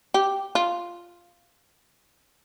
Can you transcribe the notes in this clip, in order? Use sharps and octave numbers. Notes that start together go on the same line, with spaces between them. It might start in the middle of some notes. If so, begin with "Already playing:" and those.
G4
F4